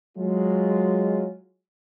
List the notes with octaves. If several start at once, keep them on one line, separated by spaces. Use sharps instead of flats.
F#3 G#3 F4